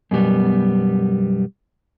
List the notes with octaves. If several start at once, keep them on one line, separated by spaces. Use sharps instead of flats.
F#2 B2 G3 B3